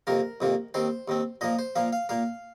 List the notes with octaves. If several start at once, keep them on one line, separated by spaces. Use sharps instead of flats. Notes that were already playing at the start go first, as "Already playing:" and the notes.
F2 C3 D#3 A#3 A#4
F2 C3 D#3 A#3
D#2 D#3 C4 C5
D#2 D#3 C4
A#2 F3 A#3 D#5
C5
A#2 F3 A#3 F5
F5
A#2 A#3 F5